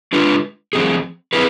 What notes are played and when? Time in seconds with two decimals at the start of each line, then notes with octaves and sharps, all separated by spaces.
0.13 G#3 D4 F4 B4
0.73 F3 A3 C4 G#4
1.33 C4 E4 G#4 B4